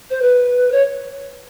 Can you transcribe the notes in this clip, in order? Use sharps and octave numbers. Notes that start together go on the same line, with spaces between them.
C5
B4
C#5